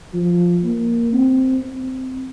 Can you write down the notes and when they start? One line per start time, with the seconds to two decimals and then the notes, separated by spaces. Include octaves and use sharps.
0.14 F3
0.64 A#3
1.13 C4
1.64 C4